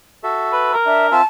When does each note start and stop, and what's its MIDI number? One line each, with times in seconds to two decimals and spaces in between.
0.23 0.75 66
0.23 0.75 69
0.23 0.75 76
0.53 0.72 71
0.73 1.14 70
0.86 1.10 62
0.86 1.07 76
1.11 1.22 60
1.11 1.22 65
1.11 1.22 76
1.11 1.24 81